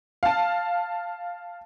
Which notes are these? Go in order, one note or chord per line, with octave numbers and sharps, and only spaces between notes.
F5 A5